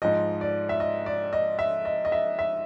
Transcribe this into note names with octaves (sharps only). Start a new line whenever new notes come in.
G#2 F3 D#5
D5
E5
D#5
D5
D#5
E5
D#5
D#5
E5
E5